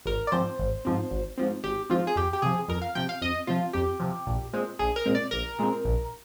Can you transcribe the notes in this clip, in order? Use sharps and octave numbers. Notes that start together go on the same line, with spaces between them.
G#1 A#4
D5
G#2 F3 C4 C5
G#1
G#2 F3 C4
G#1
G#2 F3 C4
G#1 G4
G#2 F3 C4 F4
G#4
F2 G4
G4
C3 F3 G#4
F2 A#4
F5
C3 F3 G5
F5
F2 D#5
C3 F3 F4
F2 G4
C3 F3
A#1
A#2 G#3 C4
A#1 G#4
A#4
A#2 G#3 C4
D5
A#1 A#4
A#2 G#3 C4
A#1